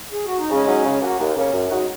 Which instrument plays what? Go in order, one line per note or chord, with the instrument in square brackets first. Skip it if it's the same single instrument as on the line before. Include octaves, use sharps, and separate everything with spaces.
[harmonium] G#4
F#4
D#4
[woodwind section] C#3 [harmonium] G#3 C#4
[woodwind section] F#3 D#4
C#3
F#3 A#3 C#4 F#4
D#2
C#3 A#3 C#4
F#2
C#3 G#3 D#4 F#4